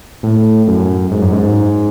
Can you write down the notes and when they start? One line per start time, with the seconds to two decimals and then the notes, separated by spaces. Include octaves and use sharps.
0.23 A2
0.67 F#2
1.11 G#2
1.22 F#2
1.33 G#2